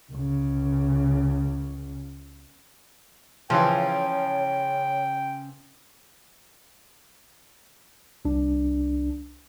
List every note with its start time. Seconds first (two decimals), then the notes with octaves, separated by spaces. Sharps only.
0.12 C#2 C#3
3.50 C#3 E3 F3 C#5 G5
8.25 C2 D4